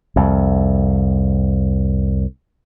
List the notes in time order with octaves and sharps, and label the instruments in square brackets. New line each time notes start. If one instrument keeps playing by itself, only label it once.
[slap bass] C2 F2